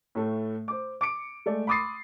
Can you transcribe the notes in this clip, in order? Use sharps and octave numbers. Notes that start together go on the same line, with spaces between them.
A2 A3
C5 D6
D6 C#7 D7
G#3 A3 D5
B5 C6 D6 D#6 A6 C7